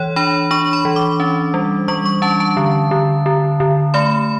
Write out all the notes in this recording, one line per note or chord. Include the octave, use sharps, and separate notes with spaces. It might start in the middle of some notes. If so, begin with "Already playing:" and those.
Already playing: E3 C#5
D4 B5
D4 C#6
B5
E3
D6
C#4
G3
G3 C#6
C#6
C#4 A5
A5
D3
D3
D3
D3
A3 B5